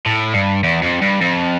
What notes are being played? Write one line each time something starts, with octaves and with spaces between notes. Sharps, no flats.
A2
G2
E2
F2
G2
F2